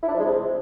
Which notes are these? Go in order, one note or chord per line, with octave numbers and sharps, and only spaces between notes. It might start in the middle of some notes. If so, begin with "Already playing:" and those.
E4
D4
F3
G#3
C3